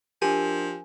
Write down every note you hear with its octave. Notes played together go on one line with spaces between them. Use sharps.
F3 D4 G4 A#4 G#5